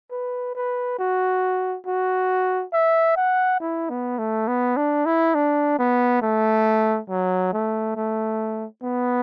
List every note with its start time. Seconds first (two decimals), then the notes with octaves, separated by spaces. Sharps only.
0.11 B4
0.55 B4
0.99 F#4
1.86 F#4
2.73 E5
3.16 F#5
3.60 E4
3.89 B3
4.18 A3
4.47 B3
4.77 D4
5.06 E4
5.35 D4
5.79 B3
6.22 A3
7.09 F#3
7.53 A3
7.96 A3
8.83 B3